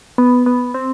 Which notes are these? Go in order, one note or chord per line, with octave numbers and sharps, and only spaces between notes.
B3
B3
C4